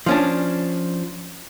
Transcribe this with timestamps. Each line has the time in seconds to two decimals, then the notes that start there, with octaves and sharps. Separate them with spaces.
0.06 F3 C#4 D4